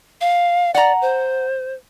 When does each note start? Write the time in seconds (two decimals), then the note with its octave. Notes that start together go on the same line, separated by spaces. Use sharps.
0.21 F5
0.75 D5 F#5 A#5
1.02 C5